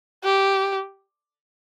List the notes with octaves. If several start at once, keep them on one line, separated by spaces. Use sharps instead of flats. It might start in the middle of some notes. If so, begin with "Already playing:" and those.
G4